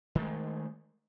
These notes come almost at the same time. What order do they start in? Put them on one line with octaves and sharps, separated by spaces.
D#3 A3 G#3